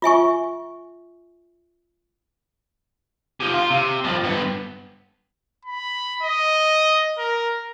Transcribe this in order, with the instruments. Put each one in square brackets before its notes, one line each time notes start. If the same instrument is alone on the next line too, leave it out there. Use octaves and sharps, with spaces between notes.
[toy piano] F4 E5 G#5 C#6
[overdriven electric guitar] C3 F3
F4
C3
G2 F3
G2 B3
[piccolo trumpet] B5
D#5
A#4